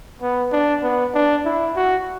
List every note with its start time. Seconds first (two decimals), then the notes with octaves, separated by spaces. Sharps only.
0.21 B3
0.52 D4
0.83 B3
1.14 D4
1.45 E4
1.76 F#4